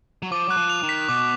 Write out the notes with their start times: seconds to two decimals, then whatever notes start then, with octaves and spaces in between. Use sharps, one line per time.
0.22 F#3
0.32 F3 D6
0.48 F#3 F#6
0.57 F3
0.69 F7
0.83 D#3
0.89 B6
1.09 B2 D6